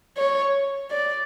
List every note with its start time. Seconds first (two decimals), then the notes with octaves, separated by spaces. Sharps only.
0.17 C#5
0.90 D5